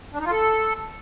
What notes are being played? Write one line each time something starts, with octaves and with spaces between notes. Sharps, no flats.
D4
D#4
F4
A4